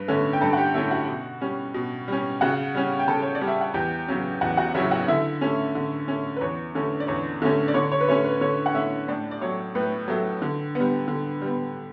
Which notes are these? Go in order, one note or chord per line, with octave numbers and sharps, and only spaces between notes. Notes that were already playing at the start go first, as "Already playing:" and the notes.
Already playing: G2 B4
D3 A3 C#4
G5
G2 A4 A5
F#5
G4 G5
D3 A3 C#4 E4 E5
F#4 F#5
B2
G3 C#4
B2
G3 C#4
C#3 F#4 F#5
G3 C#4
G5
C#3 A4 A5
C#5
D5
G3 C#4
E5
F#5
E2 G4 G5
C#3 F#3 C#4
E2 F#4 F#5
F#4 F#5
C#3 F#3 C#4 E4 E5
F#4 F#5
D3 E4 E5
A3 C#4
D3
A3 C#4
B4
E2 C#5
D3 A3 C#4
D5
E2 C#5
D3 A3 C#4
D5
D3 C#5
C#5
B4
A3 C#4 C#5
B4
D3 C#5
F#5
A3 C#4 E4 E5
A2 D4 D5
D5
F#3 A3 C#5
A2 B4
F#3 A3
D3
G3 B3
D3
G3 B3